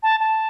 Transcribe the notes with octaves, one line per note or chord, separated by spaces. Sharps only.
A5
A5